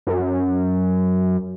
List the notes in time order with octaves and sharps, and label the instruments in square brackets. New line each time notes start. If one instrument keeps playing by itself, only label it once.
[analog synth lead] F#2